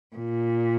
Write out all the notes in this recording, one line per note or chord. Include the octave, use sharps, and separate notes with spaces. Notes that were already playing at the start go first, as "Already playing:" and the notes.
A#2